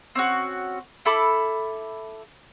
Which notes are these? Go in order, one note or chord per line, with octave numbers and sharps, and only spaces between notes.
C4 C#4 F#4
E4 A4 B5 D6